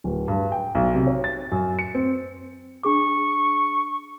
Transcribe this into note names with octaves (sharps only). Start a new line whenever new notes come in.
D1
G2
G5
B1
C3
C#5
A6
F#2
C#7
C4
D4 G#4 C#6 D6